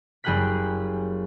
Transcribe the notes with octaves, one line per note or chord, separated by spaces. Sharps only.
F#1 G3 G#4 G5 F#6 B6